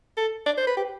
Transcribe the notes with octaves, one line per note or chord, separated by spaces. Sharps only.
A4
D5
C5
B4
G4